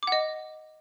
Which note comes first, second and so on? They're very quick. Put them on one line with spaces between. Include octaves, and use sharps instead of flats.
D6 F#5 D#5